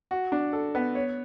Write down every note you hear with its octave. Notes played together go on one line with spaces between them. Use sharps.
F#4
D4
A4
B3
C#5